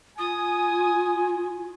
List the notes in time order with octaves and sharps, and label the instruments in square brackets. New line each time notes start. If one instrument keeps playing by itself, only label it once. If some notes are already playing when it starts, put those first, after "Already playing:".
[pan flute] F4 [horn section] G#5 [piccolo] D#6